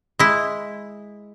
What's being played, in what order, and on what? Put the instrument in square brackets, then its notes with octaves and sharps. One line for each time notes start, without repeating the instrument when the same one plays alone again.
[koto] G#3 E4